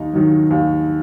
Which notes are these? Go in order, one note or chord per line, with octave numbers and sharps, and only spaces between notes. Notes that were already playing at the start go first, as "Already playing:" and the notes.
Already playing: D#2 D#4
D#3 F#3
D#2